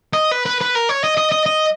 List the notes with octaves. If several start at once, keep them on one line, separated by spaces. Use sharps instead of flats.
D#5
B4
B4
B4
A#4
C#5
D#5
D#5
D#5
D#5